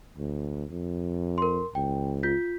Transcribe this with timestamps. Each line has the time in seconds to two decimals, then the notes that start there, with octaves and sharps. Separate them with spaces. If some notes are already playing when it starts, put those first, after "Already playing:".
0.18 D2
0.70 F2
1.38 A#4 C6
1.75 C#2 G5
2.23 F4 G6 B6